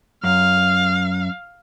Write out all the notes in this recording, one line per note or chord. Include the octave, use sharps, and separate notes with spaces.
F#2 F5